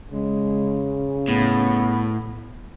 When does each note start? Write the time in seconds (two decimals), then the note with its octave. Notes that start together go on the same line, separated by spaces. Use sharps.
0.12 C#3 G#3
1.29 A2 B3